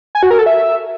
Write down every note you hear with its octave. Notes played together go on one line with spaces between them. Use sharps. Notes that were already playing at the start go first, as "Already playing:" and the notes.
G#5
F#4
A#4
A4
E5